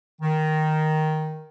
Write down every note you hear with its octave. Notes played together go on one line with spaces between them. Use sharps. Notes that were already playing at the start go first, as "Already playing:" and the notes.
D#3